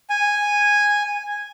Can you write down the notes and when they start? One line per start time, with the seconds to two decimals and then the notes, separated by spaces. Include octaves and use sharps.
0.10 G#5